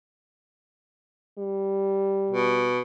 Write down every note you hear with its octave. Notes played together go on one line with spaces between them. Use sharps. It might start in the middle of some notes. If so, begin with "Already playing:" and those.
G3
B2